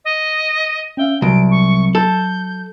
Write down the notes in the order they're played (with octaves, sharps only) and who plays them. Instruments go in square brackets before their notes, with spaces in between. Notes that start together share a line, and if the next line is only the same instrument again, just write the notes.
[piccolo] D#5
[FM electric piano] C#4 E5 F5 [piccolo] G5
[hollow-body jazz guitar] C2 [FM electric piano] F#3 [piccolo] D7
[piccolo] C#6
[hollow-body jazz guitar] A4 [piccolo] G6